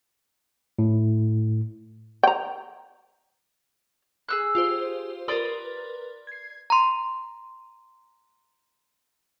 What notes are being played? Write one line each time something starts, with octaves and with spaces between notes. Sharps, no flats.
A2
G5 A#5
G#4 E6 F#6
F4 G4 C5
A#4 B4 D5 C6 D#6
G#6 C7
A#5 C6